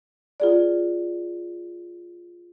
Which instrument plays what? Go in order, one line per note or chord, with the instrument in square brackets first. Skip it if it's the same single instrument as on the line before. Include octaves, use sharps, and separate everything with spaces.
[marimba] F4 G#4 D5